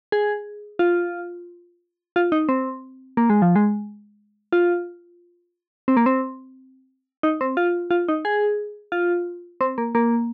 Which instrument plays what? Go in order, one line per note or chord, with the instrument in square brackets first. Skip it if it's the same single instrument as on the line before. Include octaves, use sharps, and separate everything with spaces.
[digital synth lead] G#4
F4
F4
D#4
C4
A#3
G#3
F3
G#3
F4
C4
A#3
C4
D#4
C4
F4
F4
D#4
G#4
F4
C4
A#3
A#3